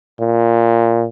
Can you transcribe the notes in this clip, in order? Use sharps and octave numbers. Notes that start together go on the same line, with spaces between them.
A#2